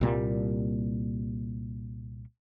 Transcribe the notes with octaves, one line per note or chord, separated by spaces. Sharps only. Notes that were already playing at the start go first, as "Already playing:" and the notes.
C2 A#2 G3 A#3